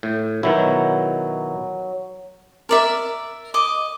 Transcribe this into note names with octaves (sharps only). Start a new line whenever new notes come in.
A2
B2 D#3 F#3 E4
A#4 D5 E5
D#5 D6